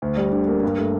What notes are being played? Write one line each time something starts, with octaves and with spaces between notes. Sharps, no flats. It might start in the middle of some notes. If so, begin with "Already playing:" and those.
D2
G3
D3
A#3
G2
A3